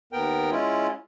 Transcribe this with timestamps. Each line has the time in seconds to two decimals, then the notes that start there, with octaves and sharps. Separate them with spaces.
0.13 D#2 B3 A#4 G5
0.51 G#3 C#4 E4 F4